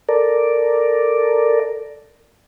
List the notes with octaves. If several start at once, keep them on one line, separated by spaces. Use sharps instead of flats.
A4 A#4 D5